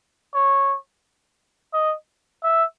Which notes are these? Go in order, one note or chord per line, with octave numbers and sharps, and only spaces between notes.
C#5
D#5
E5